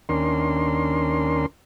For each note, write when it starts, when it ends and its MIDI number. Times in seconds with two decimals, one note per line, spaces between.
0.09 1.46 39
0.09 1.46 61
0.09 1.46 62
0.09 1.46 70
0.09 1.46 84